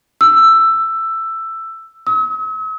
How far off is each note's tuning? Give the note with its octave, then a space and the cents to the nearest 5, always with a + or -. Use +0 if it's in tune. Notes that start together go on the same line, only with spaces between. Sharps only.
E6 +10
E6 -45